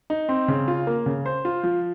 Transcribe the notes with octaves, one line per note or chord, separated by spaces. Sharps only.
D#4
C4
C#3
F4
A#3
C#3
C5
F4
F3